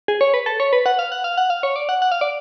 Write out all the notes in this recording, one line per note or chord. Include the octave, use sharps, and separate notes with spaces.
G#4
C#5
B4
A4
C#5
B4
F#5
F5
F#5
F5
F#5
F5
C#5
D5
F#5
F#5
F5
D5